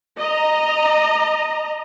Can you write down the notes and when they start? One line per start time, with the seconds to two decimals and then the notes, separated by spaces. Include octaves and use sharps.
0.19 D#5 A#5